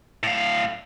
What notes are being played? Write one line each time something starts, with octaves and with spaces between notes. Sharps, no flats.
A2 F5